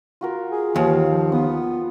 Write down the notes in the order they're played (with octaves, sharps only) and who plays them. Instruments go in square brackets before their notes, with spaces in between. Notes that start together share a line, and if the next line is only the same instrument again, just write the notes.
[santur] F4 F#4 A#4
[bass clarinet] G#4
[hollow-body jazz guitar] D#2 [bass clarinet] E3 [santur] C5 C#5 F5
[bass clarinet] F3
[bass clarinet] B3 [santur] F4 D#6